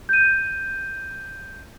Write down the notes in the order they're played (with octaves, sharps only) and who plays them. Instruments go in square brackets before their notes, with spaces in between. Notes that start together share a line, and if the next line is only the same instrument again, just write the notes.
[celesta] G6 D#7